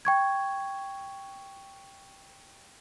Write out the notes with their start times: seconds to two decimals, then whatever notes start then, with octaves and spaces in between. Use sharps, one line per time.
0.05 G5 C#6 G#6